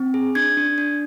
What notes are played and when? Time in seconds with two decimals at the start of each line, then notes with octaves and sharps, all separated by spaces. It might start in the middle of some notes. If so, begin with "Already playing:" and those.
Already playing: C4
0.14 G#4
0.35 D4 G#6
0.57 D4
0.78 D4